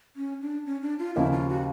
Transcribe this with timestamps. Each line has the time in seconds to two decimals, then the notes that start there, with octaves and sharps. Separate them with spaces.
0.16 C#4
0.41 D4
0.66 C#4
0.82 D4
0.99 F4
1.15 D#2 C#3 F3 A#3 E4
1.32 F4
1.49 F#4